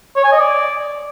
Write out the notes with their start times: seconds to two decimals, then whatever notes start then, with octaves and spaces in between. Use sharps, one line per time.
0.16 C#5
0.24 G#5
0.32 D#5
0.39 D5